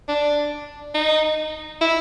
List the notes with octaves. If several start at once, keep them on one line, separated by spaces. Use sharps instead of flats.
D4
D#4
E4